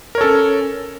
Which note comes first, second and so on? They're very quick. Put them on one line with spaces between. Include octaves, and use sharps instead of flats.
A#4 C#5 A4 C#4